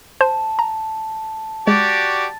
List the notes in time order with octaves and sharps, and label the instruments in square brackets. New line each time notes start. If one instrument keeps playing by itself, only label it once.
[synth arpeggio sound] C5 [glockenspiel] A5
[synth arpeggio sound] A#5
[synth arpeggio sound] G#3 [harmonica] F#4 G4 D5 [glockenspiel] A6